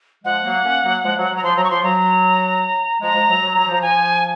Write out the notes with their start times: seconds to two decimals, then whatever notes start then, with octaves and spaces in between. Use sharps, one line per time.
0.24 F3 G#3 F#5
0.44 F#3 A#3
0.64 A#3 C#4
0.83 F#3 A#3
1.03 F3 G#3
1.17 F#3
1.31 F#3
1.36 A#5
1.43 F3 C6
1.56 F#3 A#5
1.64 C#6
1.70 F3 C6
1.83 F#3 A#5
3.02 F3 G#3 A#5
3.15 F3 G#3
3.29 F#3
3.42 F#3
3.56 F#3
3.68 F3
3.82 F3 G#5